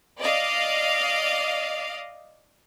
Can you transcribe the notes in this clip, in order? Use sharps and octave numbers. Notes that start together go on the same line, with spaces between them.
D5 D#5 F5